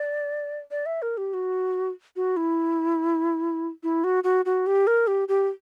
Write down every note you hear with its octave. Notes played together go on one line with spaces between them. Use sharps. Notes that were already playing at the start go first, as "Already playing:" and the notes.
Already playing: D5
D5
E5
A#4
G4
F#4
F#4
E4
E4
F#4
F#4
F#4
G4
A#4
G4
G4